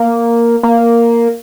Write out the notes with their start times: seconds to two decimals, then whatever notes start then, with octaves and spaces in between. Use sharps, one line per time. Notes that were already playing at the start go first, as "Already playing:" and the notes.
Already playing: A#3
0.63 A#3